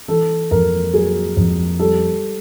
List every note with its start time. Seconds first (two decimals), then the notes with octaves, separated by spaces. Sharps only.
0.08 E3 A4
0.51 F2 A#4
0.94 F#3 G#4
1.37 F2
1.79 G3 A4